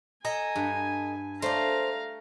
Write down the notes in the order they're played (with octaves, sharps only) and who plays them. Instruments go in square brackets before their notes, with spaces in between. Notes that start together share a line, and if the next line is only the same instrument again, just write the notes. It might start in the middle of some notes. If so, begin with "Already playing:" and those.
[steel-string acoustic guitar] A4 D#5 A#5 [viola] G#5
[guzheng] G2
[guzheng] A3 [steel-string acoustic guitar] C5 D5 [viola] F5 A#5